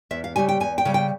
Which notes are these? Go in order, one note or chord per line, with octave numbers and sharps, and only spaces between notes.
E2 E5
F5
C#3 G3 G#5
G5
E2 G#5
G5
C#3 G3
G5